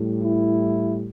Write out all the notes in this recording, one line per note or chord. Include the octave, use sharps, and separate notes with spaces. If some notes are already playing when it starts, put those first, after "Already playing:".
Already playing: A2 G3
E4